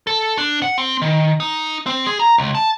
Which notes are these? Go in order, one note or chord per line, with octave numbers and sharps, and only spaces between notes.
A4
D4
F#5
C4
D#3
D#4
C4
G#4
A#5
C#2
A5